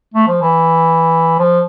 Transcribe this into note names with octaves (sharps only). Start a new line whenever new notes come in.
A3
F3
E3
F3